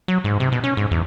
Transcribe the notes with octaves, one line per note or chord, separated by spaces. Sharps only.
F#3
G#2
C3
B2
C#4
G#2
E2